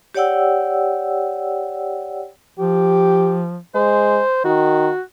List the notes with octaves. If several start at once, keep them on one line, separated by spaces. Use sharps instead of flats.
G4 C#5 D5 F#5 G5 E6
F3 G4
G#3 C5
D#3 F#4